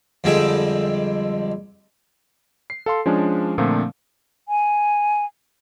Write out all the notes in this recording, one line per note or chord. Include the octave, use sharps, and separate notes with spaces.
F2 D3 G3 G#3 E5
C7
A4 F5 C6
F3 G#3 C#4 D4
A#2 D3 F3 A3 A#3 C4
G#5